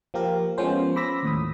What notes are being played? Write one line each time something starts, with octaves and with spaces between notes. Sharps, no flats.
F3 A#3 G4 A#4
F3 G#3 B3 C#4 C5
B5 D6 E6 A#6 B6
D#2 A2 D#6